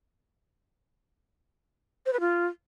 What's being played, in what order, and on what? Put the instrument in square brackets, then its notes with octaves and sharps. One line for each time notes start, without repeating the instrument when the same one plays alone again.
[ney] C5
B4
F4